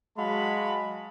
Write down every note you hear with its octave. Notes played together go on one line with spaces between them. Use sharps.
F#3 G#3 F#4 F5 A5 B5